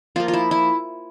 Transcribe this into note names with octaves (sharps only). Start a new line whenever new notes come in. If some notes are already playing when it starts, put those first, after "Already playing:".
F3 A#3 F4
F4
E4
E4